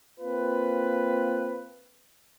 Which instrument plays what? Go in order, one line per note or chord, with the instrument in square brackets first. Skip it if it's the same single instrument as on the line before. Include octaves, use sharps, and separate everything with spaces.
[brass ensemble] A#3 C4 F4 B4